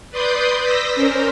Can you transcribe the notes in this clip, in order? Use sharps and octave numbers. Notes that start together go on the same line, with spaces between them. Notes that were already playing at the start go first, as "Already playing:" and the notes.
B4 D5 C6 D#6 G6
E6 A#6 B6
C#4 A#4 C5